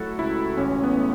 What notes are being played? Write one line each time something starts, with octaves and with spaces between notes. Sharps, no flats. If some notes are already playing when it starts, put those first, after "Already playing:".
Already playing: F#3 A3 E4 F#4 A4
C#2 E4
A1 C#4
B3
A3